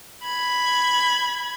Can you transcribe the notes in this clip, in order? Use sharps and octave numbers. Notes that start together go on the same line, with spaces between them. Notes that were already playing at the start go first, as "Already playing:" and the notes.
B5 G#6